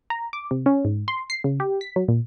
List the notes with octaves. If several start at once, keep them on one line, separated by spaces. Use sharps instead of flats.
A#5
D6
C3
C#4
G#2
C6
C7
C#3
G4
B6
F#3
A#2